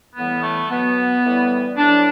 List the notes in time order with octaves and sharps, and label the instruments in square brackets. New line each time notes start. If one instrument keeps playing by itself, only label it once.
[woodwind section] A2 E3 G3 B3
A3
B2 F#3 B3
A2 E3 G3
A2 F#3 D4